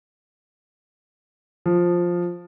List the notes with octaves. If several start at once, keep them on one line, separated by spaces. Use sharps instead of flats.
F3